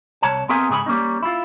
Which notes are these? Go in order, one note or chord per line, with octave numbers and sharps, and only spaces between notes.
C2 C#5 A5
B3 C4 G#4 A#4 E5 G#5
G#2 C#3 G#4 C5 B5
G3 A#3 C#4 D#4
E4 F4